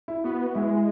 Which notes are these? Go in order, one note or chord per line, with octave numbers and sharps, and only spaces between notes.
E4
B3 F#4
G#3 E4